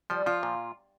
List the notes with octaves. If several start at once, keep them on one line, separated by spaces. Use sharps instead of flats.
F3 G3
F3 F4
A#2